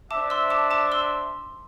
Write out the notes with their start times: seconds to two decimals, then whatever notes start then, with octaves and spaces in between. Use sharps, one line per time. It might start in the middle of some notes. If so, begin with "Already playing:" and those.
0.11 D4 C5 E5 A5 D6
0.30 C6 E6
0.50 A5 D6
0.71 A5 D6
0.92 C6 E6